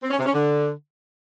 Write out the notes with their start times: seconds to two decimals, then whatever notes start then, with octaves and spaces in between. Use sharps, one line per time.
0.03 C4
0.11 C#4
0.18 C3
0.26 C#4
0.34 D3